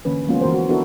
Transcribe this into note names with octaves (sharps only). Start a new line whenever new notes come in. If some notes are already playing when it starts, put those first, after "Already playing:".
D3 E3 A#3 C#4 B4
F3 G#3 A#3 B3 C#4 F4
E3 F#4 A#4 C5
F#4
B3 D4 E4 F#4 A4 A#4